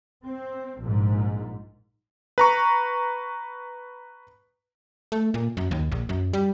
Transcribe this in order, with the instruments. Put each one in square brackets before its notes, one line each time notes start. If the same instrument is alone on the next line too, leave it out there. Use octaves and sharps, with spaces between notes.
[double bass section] C4
A#1 G#2
[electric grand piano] B4 A#5 C#6
[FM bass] A3
A#2
F#2
D#2
A#1
F#2
G3